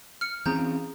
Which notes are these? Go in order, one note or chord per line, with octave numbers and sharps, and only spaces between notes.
F6 C#7
E3 C4 C#4 G#4 A#5 G6